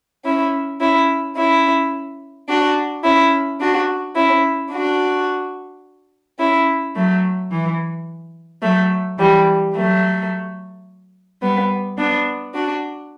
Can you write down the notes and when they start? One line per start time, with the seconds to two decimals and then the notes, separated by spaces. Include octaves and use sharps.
0.24 C#4 E4
0.80 C#4 E4
1.36 C#4 E4
2.49 D4 F#4
3.03 C#4 E4
3.60 D4 F#4
4.15 C#4 E4
4.72 D4 F#4
6.39 C#4 E4
6.95 F#3 A3
7.51 E3
8.62 F#3 A3
9.18 E3 G3
9.74 F#3 A3
11.42 G3 B3
11.97 B3 D4
12.54 D4 F#4